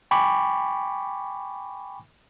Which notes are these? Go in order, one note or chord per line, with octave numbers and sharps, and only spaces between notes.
G5 G#5 B5 C#6 D6